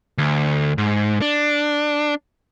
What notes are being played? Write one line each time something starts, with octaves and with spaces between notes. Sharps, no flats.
D2
G#2
D4